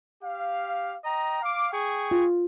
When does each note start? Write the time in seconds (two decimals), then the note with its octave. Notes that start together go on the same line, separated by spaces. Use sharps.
0.22 G4 F5
1.05 D#5 G5 A#5
1.42 F5 D6
1.72 G#4 G5 C#6
2.11 F4